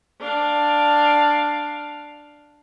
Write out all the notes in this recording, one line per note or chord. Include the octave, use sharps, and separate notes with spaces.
D4 F5